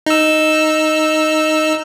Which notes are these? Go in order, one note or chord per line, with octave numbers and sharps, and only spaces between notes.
D#4 E6